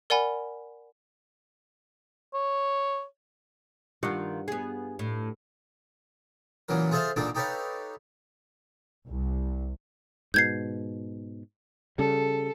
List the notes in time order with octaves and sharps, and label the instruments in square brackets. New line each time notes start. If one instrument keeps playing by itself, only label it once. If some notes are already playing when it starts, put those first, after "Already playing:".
[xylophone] A#4 D5 F#5 G#5 B5
[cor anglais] C#5
[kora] G2 F#5 [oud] D#3 F4
[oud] B3 G#4
A2
[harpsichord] A#2 C#3 E3 F#3 A#4
F4 G#4 A4 C5 E5 F5
A#2 D3 D4 D#4 G#4 A4
D#4 G4 A4 B4 C#5 F5
[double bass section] C2
[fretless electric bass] G#2 B2 [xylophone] G6 G#6 C7
[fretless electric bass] C#3 G3 [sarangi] A4